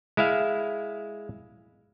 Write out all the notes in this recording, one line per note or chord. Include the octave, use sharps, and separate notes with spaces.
G#3 E4 E5 F5